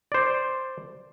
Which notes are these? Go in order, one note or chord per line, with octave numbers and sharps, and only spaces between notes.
C5 D5